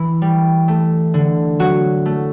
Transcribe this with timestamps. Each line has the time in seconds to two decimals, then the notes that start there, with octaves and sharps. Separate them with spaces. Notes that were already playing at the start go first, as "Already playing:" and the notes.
Already playing: E3 E4
0.22 G3
0.68 A3
1.14 D3
1.59 F#3 F#4
2.06 A3